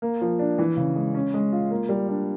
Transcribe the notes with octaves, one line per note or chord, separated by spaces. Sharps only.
A#3
F3
D4
E3
C#3
G#3
C#4
G#3
F4
A#3
G3
D4